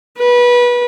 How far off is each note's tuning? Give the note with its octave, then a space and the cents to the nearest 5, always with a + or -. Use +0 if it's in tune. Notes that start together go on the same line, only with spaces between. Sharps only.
B4 -25